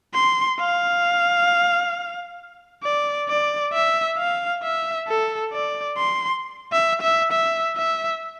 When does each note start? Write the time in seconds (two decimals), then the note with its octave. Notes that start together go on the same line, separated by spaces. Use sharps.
0.14 C6
0.60 F5
2.83 D5
3.28 D5
3.73 E5
4.18 F5
4.63 E5
5.07 A4
5.53 D5
5.97 C6
6.72 E5
7.01 E5
7.32 E5
7.76 E5